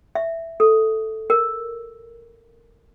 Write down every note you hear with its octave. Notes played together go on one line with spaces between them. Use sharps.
E5
A4
A#4